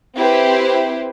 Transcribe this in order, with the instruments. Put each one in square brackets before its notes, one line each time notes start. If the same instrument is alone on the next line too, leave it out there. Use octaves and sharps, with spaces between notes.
[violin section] C4 E4 G4 B4 C5